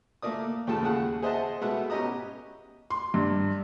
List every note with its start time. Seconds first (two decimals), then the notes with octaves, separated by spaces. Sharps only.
0.22 A3 A#3 D5 D#6
0.67 D#2 A2 C#3 F4 A4 A5
0.82 D#2 C#3 G#4 F#5
1.22 G#4 C5 D#5 E5 F#5 A5
1.61 B2 G#3 A3 B3 E5 F#5
1.90 B3 C#4 G4 D#5 A#5 D#6
2.90 C6
3.14 G2